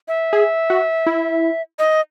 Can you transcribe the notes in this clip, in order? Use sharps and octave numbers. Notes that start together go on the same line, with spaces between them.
E5
G#4
F#4
E4
D#5